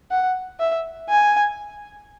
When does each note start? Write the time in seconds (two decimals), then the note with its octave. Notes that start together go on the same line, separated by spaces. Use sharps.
0.11 F#5
0.59 E5
1.09 G#5